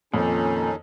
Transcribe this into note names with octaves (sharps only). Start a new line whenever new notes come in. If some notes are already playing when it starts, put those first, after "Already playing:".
F2 A#2 D#3 C#4 D#4 A4